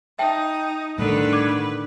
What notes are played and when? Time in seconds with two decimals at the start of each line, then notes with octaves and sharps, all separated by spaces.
0.19 D#4 E5 G5 A5
0.98 A2 D3 D#3 G3 A3 B4
1.33 D6 G6 G#6